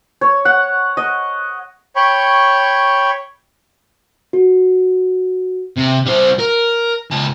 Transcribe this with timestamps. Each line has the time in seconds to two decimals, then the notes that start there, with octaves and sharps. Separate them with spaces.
0.21 C#5
0.45 F#5
0.97 D#5
1.96 C#5 G5 B5 C#6
4.33 F#4
5.76 C3
6.06 G3 C5
6.39 A#4
7.11 C#2 A5